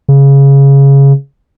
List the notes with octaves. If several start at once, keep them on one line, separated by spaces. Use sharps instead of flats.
C#3